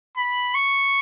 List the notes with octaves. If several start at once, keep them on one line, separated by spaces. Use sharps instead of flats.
B5
C#6